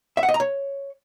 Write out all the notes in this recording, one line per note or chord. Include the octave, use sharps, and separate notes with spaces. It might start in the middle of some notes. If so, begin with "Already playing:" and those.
E5
F#5
D#5
A#5
C#5